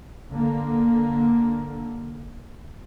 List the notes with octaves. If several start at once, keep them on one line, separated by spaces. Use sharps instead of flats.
D3 A#3